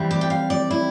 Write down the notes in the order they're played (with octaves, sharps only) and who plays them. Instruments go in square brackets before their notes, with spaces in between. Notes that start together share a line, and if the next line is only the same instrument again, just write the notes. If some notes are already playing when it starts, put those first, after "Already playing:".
Already playing: [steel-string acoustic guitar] E3 G3 C4
D5
G5
F5
D5
E4